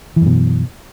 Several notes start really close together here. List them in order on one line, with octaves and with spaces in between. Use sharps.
E3 F#2 B2